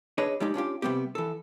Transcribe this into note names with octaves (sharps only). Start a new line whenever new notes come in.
D4 G#4 B4 C#5 D#5
G3 G#3 D#4 G4
C#4 D4 F4 G4
C3 G3 B3 C4 G4
E3 A4